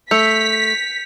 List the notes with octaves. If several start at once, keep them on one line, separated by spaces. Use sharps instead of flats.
A3 G6 B6 C#7 F7